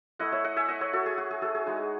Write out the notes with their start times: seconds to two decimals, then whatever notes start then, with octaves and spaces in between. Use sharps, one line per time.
0.19 A3 E4 D#5 F#5
0.32 C#5 E5
0.44 D#5 F#5
0.56 E5 G#5
0.68 D#5 F#5
0.81 C#5 E5
0.93 F#4 A4
1.06 G#4
1.18 F#4
1.31 G#4
1.42 F#4 A4
1.55 G#4
1.66 G#3 D#4 F#4